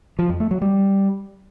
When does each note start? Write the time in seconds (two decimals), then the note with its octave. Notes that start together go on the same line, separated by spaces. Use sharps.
0.19 F3
0.29 F2
0.40 A3
0.51 F#3
0.62 G3